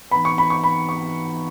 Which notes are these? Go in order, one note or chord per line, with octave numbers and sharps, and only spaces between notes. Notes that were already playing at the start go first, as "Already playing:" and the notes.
E3 B3 D#4 B5
C#6
B5
C#6
B5
C#6